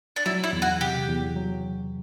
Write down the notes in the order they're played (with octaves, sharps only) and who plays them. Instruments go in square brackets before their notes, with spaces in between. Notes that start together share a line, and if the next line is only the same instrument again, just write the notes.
[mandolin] D4
[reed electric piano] F#3 [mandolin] E4
[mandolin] E4
[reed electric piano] E2
[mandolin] F#4
[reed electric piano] C3 [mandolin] G4
[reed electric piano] E2
F#3